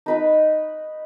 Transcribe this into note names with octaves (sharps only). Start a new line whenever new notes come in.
D#4 B4 B5